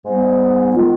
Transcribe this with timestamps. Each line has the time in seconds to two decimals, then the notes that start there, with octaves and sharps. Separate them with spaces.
0.05 G#2 G3 B3
0.76 D#3 G#3 B3 F4